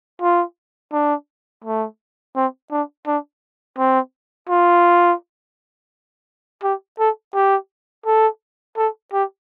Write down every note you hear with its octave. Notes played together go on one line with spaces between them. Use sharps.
F4
D4
A3
C4
D4
D4
C4
F4
G4
A4
G4
A4
A4
G4